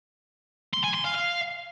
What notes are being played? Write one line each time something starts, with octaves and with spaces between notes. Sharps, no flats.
C6
G#5
C6
F5
F5